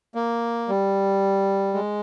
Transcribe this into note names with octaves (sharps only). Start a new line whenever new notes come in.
A#3
G3
G#3